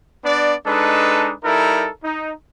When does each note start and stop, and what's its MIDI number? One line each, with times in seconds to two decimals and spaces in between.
0.24 0.54 59
0.24 0.54 62
0.24 0.54 74
0.66 1.33 56
0.66 1.33 62
0.66 1.33 63
0.66 1.33 69
0.66 1.33 71
1.43 1.88 55
1.43 1.88 63
1.43 1.88 64
1.43 1.88 69
1.43 1.88 70
2.03 2.32 63